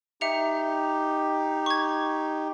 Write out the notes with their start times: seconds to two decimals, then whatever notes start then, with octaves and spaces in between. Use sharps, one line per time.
0.21 D#4 G4 E5 C#7 F7
1.66 C#6 G#6